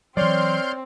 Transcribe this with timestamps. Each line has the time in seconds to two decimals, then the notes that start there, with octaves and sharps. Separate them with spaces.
0.17 E3 F#3 C4 C#5 D5 C6 F6 G6